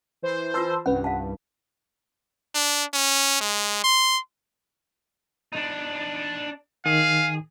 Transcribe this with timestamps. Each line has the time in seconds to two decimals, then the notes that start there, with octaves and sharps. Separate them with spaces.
0.22 E3 C5
0.54 F4 B4 A5 C6 E6
0.86 C2 G2 C#4 B4 F#5
1.04 F5 A5
2.55 D4
2.93 C#4
3.41 G#3
3.84 C6
5.53 D4 D#4
6.86 D#3 G#4 F5